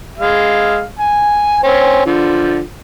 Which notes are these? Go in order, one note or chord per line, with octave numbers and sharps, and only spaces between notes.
G#3 F5
G#5
C4 C#4
D3 F3